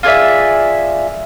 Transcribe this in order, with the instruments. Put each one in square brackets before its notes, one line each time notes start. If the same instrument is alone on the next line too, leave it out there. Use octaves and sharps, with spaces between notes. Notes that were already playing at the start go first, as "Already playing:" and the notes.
[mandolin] F4 G#4 D5 E5